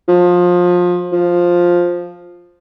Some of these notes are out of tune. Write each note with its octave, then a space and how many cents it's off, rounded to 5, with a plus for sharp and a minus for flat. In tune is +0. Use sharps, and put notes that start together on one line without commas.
F3 +25
F3 +5